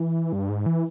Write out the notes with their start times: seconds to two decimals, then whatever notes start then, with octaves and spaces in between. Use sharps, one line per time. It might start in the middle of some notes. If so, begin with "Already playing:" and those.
Already playing: E3
0.33 G2
0.49 G#2
0.66 E3